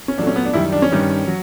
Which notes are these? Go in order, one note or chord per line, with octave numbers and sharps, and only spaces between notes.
C#4
A#2 F#3 A3 D4
C#4
B3
D4
F#2 D#3 G3 E4
D4
C#4
G2 D#3 G3
F#3